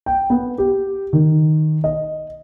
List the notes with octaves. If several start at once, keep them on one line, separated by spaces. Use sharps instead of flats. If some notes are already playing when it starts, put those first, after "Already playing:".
G5
B3
G4
D#3
D#5